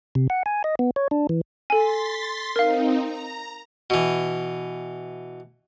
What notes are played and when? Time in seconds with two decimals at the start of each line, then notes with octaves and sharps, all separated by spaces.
0.15 C3
0.30 F#5
0.46 G#5
0.64 D#5
0.79 B3
0.96 C#5
1.11 D4
1.29 E3
1.70 A4 G#5 C6 A6 B6
2.56 C4 D#4 A#4 F5
2.98 A#5
3.90 B2 E3